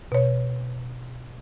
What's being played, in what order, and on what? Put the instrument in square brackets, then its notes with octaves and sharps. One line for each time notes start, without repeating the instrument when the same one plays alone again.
[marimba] B2 C#5